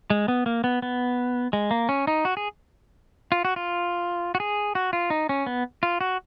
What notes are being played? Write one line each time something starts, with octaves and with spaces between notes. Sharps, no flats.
G#3
B3
A#3
B3
B3
G#3
A#3
C#4
D#4
F#4
G#4
F4
F#4
F4
F#4
G#4
F#4
F4
D#4
C#4
B3
F4
F#4